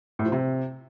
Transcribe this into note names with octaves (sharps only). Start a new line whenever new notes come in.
A2
F3
C3